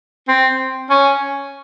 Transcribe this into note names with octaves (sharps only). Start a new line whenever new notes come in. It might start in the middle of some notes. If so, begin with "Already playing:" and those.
C4
C#4